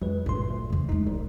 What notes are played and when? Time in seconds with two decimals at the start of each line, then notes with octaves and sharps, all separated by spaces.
0.02 F2 F#3 G#3 B4
0.26 G#1 D2 G2 A#2 C6
0.49 D2
0.70 E2 C#3
0.89 G#3 A3 D#4
1.06 D1 B1